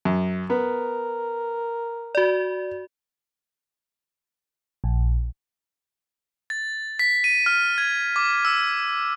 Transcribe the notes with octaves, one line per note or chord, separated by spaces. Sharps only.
F#2
B3 A#4
F#4 D5
A#1
A6
B6
D#7
F6
G#6
D6
E6